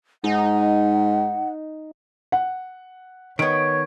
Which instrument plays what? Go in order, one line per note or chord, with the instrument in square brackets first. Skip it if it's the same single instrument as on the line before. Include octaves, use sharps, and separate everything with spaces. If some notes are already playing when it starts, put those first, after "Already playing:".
[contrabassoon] G#2 [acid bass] D#4 [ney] F#5
[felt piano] F#5
[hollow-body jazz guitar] D#3 B3 [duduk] C#5 [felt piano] D7